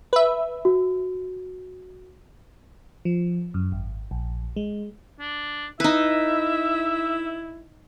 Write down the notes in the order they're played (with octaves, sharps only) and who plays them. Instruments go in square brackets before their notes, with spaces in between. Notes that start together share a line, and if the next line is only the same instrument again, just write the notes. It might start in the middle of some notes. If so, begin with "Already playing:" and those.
[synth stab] B4 E5
[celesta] F#4
[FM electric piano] F3
F#2
G#1
A#1
G#3
[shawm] D4
[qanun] D#4 B4 [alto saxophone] E4 [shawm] E5